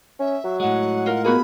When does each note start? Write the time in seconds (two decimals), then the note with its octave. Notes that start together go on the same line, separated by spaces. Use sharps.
0.19 C#4 E5
0.44 F#3
0.60 A2 G#3 F#5
1.06 F4 A#4
1.24 A#3 B3 F#4 G#4 B5